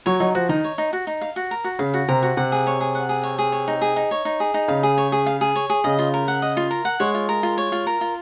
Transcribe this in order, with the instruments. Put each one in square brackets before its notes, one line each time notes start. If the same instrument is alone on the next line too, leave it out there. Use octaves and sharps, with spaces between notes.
[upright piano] F#3 [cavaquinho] C#5
[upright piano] F#3 [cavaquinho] D#4
[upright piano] F3 [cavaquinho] F#4
[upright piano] D#3 [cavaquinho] D#4
[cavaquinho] C#5
D#4
F#4
D#4
F5
F#4
A#4
F#4
[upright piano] C#3 [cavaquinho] F5
[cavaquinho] F#4
[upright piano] C3 [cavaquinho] A#4
[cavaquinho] F#4
[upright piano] C3 [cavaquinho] F#5
[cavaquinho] G#4
C#5
G#4
F#5
G#4
C#5
G#4
C#5
D#4
G#4
D#4
C#5
D#4
G#4
D#4
[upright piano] C#3 [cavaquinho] F5
[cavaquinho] G#4
C#5
G#4
F5
G#4
C#5
G#4
[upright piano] C#3 [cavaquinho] D#5
[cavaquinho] F4
A#4
F#5
D#5
F4
A#4
F#5
[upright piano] G#3 [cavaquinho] C#5
[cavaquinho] F4
A#4
F4
C#5
F4
A#4
F4